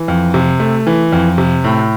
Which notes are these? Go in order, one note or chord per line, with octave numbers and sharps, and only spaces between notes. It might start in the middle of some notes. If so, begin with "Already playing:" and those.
Already playing: E3
F2
C3
A3
E3
F2
C3
A2